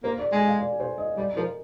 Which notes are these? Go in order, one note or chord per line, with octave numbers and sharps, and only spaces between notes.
A#3 C5
D5
G#3 G#5
F5
D5
C5
D#5
G3 D5
F3 A#4